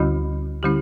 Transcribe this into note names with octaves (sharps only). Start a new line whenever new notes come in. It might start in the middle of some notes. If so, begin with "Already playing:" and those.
Already playing: D2 D3 G3 C#4 E4 F#4
D3 G3 C#4 E4 G4